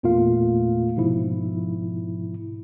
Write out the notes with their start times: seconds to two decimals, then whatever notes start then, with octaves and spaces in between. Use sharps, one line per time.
0.03 E2 A#2 A3 A#3 F4 F5
0.97 G#2 B2 F3 E4